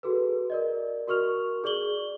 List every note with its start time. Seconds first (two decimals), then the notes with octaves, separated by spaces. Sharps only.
0.03 F#4 G#4 A4 B4
0.50 A#4 D5 D#5
1.08 F#4 A#4 C#6 F6 F7
1.64 G#4 D5 C#6 F#7 G7